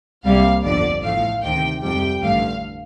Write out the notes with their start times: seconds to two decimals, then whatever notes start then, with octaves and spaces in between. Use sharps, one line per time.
0.24 C2 C3 G3 A#3 F5
0.64 G1 F2 D3 F3 D5
1.03 A1 A2 F3 A3 F5
1.43 D2 C3 D#3 G5
1.82 F2 C3 G3 G5
2.22 A1 G2 D3 A3 F5